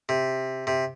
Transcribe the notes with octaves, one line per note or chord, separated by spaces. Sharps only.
C3
C3